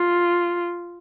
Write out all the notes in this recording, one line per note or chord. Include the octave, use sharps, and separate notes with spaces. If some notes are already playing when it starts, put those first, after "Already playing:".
Already playing: F4